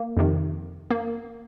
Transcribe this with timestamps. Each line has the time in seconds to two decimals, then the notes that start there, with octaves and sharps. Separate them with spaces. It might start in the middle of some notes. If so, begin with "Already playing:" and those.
Already playing: A#3
0.17 F2 C3 D#3
0.91 A#3